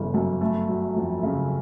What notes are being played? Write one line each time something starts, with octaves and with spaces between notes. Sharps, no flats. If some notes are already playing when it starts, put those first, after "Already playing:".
Already playing: G1 C#3 E3
F#2
A3
F#3
F2
C#3